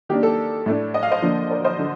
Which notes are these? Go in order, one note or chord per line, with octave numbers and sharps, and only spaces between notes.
D#3 A#3 D4 G4
A4
A2 A3 D4
D#5
F5
C5 D#5
D3 F3 A#3 D4
A#4 D5
C5 D#5
D3